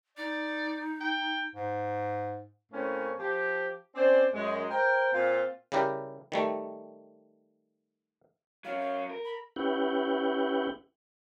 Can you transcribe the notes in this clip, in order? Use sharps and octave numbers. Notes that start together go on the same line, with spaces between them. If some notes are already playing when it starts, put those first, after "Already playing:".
D#4 D5
G5
G#2
A2 A#3 C4 C#4
F3 G4
C4 C#4 C5 D5
F#2 G#3
A#4 C5 G5
A#2 C4 F4
C#3 G3 E4 G4 A#4
D#3 G3 A3
F#3 C#4 F5
A#4
B5
C#4 E4 G4 B4 F#5 G5